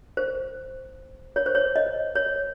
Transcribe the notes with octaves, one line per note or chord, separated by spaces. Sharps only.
C5
C#5
C5
C#5
D#5
C#5